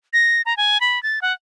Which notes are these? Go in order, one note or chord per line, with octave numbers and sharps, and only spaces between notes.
A#6
A#5
G#5
B5
A6
F#5